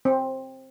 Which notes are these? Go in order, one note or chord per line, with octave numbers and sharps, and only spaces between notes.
C4